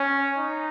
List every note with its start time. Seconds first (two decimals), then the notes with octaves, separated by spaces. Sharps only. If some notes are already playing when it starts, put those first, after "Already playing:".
Already playing: C#4
0.38 D#4